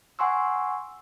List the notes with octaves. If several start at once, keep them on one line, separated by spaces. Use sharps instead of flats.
F#5 G#5 C6 C#6 E6